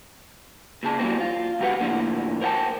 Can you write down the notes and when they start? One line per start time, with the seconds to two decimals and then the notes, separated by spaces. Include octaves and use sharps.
0.83 A#2 C#3 G#4 A5
0.99 E3 F#3 G3 A#3 C4
1.20 F4
1.59 C#2 F#2 F#4 G4 B4 F#5
1.80 A2 D3 F3 A#3 E4
2.41 A#4 C5 D#5 F#5 G5 A5